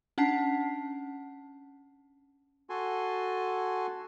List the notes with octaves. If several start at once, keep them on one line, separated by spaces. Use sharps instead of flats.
C#4 D4 F#5 A5 B6 C7
F#4 A4 G#5 C6